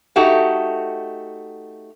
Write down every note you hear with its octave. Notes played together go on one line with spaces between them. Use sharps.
A3 D#4 F#4 G4